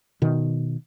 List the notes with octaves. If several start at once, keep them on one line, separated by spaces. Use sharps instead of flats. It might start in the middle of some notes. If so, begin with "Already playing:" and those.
B2 D#3